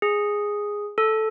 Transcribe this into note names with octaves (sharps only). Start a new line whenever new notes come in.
G#4
A4